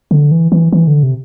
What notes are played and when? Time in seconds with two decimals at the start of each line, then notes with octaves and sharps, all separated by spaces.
0.11 D3
0.32 E3
0.52 E3
0.72 E3
0.87 D3
1.03 C3